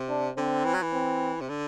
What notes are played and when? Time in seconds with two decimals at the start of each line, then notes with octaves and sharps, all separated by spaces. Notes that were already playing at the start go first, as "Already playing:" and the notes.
Already playing: C3
0.09 D4
0.37 D3 C4
0.65 E3
0.74 F#3
0.82 E3
0.93 C4
1.40 C3
1.49 D3